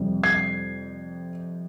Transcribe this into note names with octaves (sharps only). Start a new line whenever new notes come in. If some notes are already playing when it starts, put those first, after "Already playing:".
Already playing: F2 C3 G3
G#6 C7